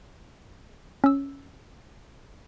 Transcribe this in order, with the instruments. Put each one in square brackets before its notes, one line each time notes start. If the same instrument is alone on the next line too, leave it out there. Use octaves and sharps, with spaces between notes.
[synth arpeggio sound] C#4 E6